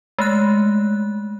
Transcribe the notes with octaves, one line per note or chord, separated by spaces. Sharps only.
G#3 A3 F#6